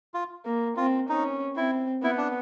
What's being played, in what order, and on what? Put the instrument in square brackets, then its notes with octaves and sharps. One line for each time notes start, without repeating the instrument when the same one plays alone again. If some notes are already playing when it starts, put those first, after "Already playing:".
[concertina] F4
[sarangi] A#3
[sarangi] C4 [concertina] F4
[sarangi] C#4 [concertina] D#4
[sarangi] C4 [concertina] E4
[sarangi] B3 [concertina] E4
[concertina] D4